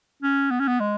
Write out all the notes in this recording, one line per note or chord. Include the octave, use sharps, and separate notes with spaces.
C#4
B3
C#4
B3
G#3